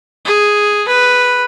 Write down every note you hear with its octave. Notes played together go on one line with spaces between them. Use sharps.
G#4
B4